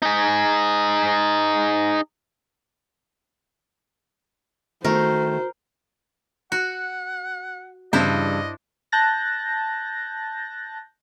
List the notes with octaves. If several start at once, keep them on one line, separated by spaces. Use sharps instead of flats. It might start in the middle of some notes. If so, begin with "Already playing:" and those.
D#4 G#4
D#3 A3 F#4 A#4 C5
F#4 F#5
G2 C#3 E3 D4 E4 C5 D#5
A5 F#6 G6 A6 A#6